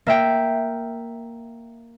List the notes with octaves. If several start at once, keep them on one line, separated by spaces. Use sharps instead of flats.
A#3 E5 G5